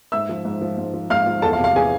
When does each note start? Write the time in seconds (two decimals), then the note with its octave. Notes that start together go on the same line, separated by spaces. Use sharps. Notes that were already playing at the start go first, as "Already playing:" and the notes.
0.12 G#2 E5 E6
0.29 F3
0.45 G#2
0.61 F3
0.78 G#2
0.93 F3
1.10 G#2 F5 F6
1.27 F3
1.42 E2 A4 A5
1.53 F5
1.59 C3
1.64 F5
1.76 E3 G#4 G#5